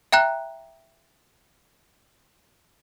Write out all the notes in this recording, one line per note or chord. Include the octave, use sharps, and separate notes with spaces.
E5 G5 A#5 F#6